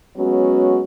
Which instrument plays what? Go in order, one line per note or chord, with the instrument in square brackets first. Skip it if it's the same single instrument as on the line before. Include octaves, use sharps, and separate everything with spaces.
[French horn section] F#3 G#3 B3 C#4 F#4